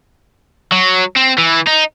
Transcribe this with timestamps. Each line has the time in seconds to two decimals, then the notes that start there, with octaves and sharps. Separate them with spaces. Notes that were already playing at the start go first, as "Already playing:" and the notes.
0.72 F#3
1.16 C4
1.38 E3
1.67 D#4